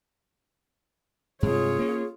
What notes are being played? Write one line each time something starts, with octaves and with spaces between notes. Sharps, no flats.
G2 C3 G#3 F4 G#4 C#5
A#3 C#4